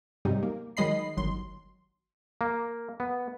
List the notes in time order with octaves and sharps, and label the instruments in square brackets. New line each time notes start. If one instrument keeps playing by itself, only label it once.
[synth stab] G#2 C3 F#3 G3 D#4
A#3
D#3 F#3 G#3 D#5 B5 C7
G1 D#3 F#3 C6
[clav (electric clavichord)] A#3
B3